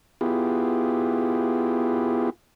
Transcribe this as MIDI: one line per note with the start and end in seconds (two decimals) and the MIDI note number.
0.21 2.30 59
0.21 2.30 64
0.21 2.30 65
0.21 2.30 67
0.21 2.30 68